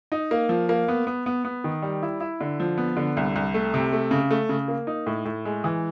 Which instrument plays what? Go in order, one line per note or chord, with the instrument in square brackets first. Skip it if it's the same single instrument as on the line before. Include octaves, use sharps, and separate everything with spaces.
[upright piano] D#4
A#3
F3
A#3
B3
B3
B3
B3
D#3
G3
E4
E4
D3
F3
B3
D3
C2
C2
A3
C3
A3
C#3
A3
C#3
A#3
D#4
A2
A2
G#3
E3